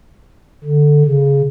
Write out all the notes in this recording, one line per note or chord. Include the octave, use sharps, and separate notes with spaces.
D3
C#3